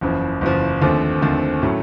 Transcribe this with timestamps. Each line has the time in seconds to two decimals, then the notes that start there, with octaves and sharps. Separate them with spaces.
0.01 F#1 E2 C#3 F3
0.41 F#1 E2 C#3 F3
0.82 D#2 D3 F3 A3 C4
1.22 D#2 D3 F3 A3 C4
1.62 A2 F#3 A3 C#4